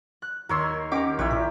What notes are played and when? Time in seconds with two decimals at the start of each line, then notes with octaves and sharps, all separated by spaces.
0.22 F#6
0.49 D#2 A#4 C#5 C6 E6
0.92 C#4 G4 A#4 D#5 F#5 D6
1.19 A#1 E4 G4 C#6 F#6
1.31 A#2 A#5